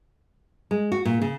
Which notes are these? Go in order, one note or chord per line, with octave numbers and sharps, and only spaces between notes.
G#3
F#4
A#2
C#3